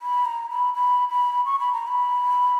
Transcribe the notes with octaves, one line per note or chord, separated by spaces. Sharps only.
B5
A#5
B5
B5
B5
C#6
B5
A#5
B5